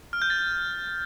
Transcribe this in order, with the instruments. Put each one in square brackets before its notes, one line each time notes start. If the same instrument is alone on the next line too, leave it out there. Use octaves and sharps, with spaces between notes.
[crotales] F6
G6
A6
G6